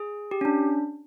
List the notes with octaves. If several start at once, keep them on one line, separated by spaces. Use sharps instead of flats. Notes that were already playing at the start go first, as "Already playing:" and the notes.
Already playing: G#4
G4
C#4
D4